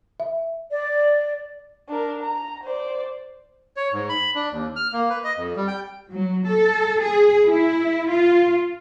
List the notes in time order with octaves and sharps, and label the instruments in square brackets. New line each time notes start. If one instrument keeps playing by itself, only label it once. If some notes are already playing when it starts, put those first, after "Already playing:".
[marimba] E5
[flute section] D5
[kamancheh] D4 A#4
A#5
C5 D5
[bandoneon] C#5
G#2
B5
D4
D#2
F6
A#3
B4
D#5
F2
G3
G5
[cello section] F#3
A4
G#4
E4
F4